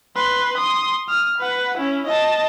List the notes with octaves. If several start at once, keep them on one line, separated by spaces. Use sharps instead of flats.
B4 C6
C6 D#6
D#6 F6
B4 F#5
C#4 E4
D#5 A5